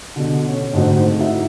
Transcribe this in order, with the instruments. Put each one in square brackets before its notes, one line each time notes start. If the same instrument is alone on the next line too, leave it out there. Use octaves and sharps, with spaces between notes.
[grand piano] B2 D3
C#4
G#2 D3 A3 C4 D#4 F#4
D#4 E4 F#4 E5